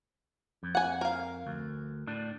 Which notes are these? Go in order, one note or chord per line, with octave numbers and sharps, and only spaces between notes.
F2
F#5 G#5
A#4 F5
D2
A2 D4